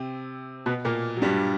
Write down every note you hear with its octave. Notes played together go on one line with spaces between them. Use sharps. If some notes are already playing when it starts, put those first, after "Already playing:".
Already playing: C3 C4
B2 B3
A#2 A#3
F#3
G2 G3